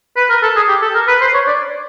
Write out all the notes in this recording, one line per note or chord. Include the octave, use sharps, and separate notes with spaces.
B4
A#4
A4
G#4
G4
A4
A#4
B4
C5
C#5
D5